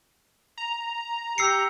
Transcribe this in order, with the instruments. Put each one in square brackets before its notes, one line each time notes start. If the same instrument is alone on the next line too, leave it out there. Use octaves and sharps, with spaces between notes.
[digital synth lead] A#5
[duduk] G4 [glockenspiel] E6 C7 C#7